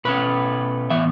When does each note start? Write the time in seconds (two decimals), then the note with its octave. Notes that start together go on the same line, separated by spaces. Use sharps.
0.05 B2 A3 C#4 B4
0.90 A2 E3 B3 E5